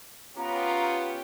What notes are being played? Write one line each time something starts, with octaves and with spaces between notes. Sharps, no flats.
B3 C#4 F4 G4 A#5